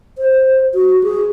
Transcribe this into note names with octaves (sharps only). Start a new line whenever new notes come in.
C5
F#4
G#4